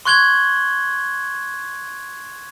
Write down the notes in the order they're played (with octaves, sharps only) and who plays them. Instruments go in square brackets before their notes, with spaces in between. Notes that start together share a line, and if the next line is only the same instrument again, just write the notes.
[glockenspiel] C6 C#6 F#6 G#6 F#7 G7